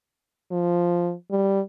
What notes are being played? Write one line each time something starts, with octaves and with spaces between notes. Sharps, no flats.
F3
G3